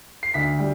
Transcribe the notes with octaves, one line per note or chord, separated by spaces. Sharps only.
C7
D2 B6
G3